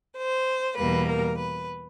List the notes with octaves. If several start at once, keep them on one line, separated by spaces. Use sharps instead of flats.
C5
E2 B2 G3 A#3 B4
A#4
B4